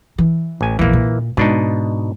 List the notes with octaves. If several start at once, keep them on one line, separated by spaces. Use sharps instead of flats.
E3
A1 G#5
A#1 E2 E3 A#3
A#2
G#2 B2 D4 D#4